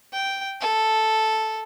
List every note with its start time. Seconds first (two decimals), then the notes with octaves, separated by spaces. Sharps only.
0.13 G5
0.61 A4